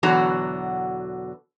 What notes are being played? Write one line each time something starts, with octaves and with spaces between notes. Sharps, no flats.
E2 B2 D3 F#3 F#4 A#5